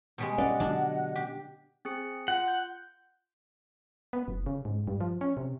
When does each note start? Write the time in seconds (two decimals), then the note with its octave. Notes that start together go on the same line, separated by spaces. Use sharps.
0.18 B2 G3 G#3
0.38 C#4 D5 D#5 F#5 F#6
0.60 D3 F#3 D4
1.16 G4
1.85 C4 G#4 C#7
2.28 F4 F#5
2.48 G6
4.13 B3
4.28 F#1
4.46 C#3
4.65 G#2
4.87 G2
5.01 F3
5.21 C#4
5.37 C3